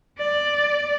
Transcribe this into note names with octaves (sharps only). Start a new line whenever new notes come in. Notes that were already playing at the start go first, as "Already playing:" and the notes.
D5